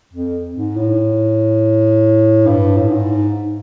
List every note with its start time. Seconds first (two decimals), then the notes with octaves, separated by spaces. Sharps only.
0.13 F2
0.55 G#2
0.77 A2
2.47 G2
2.77 A2
2.89 G#2